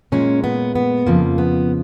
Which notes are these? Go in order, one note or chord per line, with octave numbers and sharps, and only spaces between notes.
A#2 G#3 C#4
B3
B3
F2 C#3 F3 A#3
B3